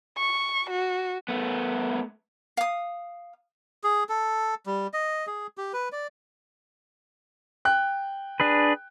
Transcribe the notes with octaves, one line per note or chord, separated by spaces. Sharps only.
C#6
F#4
A3 B3
F5 D#6
G#4
A4
G3
D#5
G#4
G4
B4
D5
G5 F#6
D4 G#4 B4